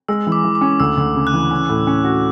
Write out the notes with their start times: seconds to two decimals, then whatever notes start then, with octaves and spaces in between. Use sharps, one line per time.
0.08 G#3 E6
0.27 E3
0.32 D6
0.44 E3
0.55 D6
0.61 C#4
0.80 D2 E6
0.97 D2
1.15 C#3
1.27 F#6
1.33 E3
1.51 C#4
1.69 A2
1.87 C#4
2.04 F#4